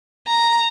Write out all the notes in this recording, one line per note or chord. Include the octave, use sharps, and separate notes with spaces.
A#5